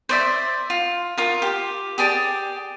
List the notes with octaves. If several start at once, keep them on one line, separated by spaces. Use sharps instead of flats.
C5 D5 E5
F4
F4 A#4
G4
G4 G#4 D5 G5